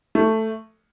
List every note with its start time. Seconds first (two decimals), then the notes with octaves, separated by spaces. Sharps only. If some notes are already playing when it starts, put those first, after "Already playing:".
0.15 A3